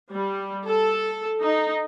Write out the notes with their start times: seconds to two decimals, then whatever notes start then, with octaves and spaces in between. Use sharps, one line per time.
0.11 G3
0.66 A4
1.40 D#4